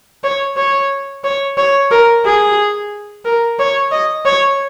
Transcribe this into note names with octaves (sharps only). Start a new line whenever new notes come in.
C#5
C#5
C#5
C#5
A#4
G#4
A#4
C#5
D#5
C#5